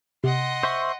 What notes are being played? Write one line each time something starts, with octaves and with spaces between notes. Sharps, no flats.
C3 D#5 F#5 C6
C5 E5 C#6